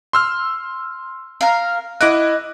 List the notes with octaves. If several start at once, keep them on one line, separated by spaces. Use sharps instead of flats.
C6 E6 F6
A#4 F5
E4 D#5 F#5 D6 F#6